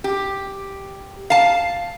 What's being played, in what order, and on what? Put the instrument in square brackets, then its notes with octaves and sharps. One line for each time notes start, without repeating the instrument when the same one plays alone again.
[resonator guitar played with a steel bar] G4
F5 A5